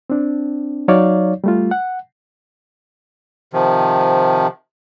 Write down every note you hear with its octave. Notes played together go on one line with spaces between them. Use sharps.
C4 D4
F#3 D#4 C#5 D5 F5
G3 A3 F4
F#5
C3 D#3 F3